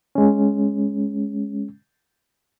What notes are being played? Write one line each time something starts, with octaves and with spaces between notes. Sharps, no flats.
G#3 C#4